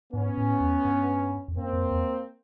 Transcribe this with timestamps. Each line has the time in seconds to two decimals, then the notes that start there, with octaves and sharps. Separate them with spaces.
0.13 G#2 B3 C#4
0.38 A2
0.60 E2
0.85 G2
1.48 F2
1.56 F#2 A#3 C4
1.73 F2
1.91 E2